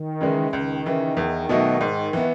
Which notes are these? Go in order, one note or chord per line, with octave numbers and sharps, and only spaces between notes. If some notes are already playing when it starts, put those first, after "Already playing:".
Already playing: D#3
C#3 E3 G#3
C#2 D#3
C#3 E3
E2
B2 F#3 A3 D#4
G#2
E3 B3